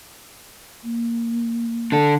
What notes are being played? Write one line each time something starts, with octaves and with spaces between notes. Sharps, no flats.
A#3
D3 A4